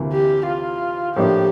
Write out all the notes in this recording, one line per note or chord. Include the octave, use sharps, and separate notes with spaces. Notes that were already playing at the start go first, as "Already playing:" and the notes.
Already playing: D2 C3 E3 A#3
G4
F4
A2 F3 A#3 D4 G4